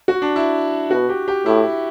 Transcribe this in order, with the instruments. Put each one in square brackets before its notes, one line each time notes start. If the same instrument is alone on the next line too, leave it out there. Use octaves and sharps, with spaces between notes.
[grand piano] F#4
D4
E4
[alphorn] B2 [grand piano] F#4
[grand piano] G4
G4
[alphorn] A2 [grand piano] E4